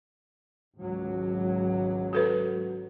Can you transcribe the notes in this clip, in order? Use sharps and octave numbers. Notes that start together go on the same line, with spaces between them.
G#1 C#2 F#3
F#4 A4 B4